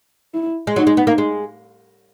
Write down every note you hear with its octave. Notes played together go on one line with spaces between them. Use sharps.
E4
G#3
F#3 D#4
G#3
B3
A#3
G#3